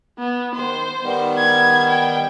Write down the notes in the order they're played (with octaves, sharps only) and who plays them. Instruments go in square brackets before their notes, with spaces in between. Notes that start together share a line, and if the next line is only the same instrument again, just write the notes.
[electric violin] B3
[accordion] D#3 [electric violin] C5
[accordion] D#3 G3 B3
[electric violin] G#6
G5